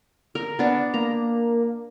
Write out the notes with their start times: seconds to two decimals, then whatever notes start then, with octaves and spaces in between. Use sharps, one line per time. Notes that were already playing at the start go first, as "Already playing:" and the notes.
0.35 A#4
0.59 B3 D4
0.94 A#3 A#5